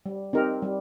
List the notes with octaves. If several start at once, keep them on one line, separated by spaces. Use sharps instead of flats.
G3
C4 D#4 G4 A#4
G3